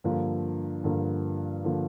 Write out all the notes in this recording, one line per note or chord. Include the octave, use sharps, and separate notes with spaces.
G2 D3 F3 A#3
G2 D3 F3 A#3
D3 F3 A#3